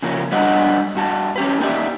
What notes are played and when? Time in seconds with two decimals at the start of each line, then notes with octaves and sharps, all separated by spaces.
0.02 C#3 F3 A#3 C#4
0.32 F#3 G3 D4 B4 D#5 F#5
0.95 G2 F#4 A5
1.36 C#4 G4 B4
1.60 A#3 D#4 G4 D5 E5